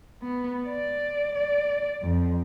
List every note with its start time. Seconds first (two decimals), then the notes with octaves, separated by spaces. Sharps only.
0.22 B3
0.67 D5
1.35 D5
2.02 F2